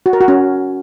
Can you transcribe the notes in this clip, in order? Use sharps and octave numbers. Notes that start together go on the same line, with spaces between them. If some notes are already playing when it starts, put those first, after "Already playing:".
F#4
A#4
F#4
C#4